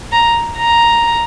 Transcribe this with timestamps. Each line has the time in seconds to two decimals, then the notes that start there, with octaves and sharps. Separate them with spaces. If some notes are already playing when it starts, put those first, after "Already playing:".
0.12 A#5
0.57 A#5